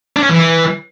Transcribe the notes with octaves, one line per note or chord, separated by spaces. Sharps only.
D4
C#4
E3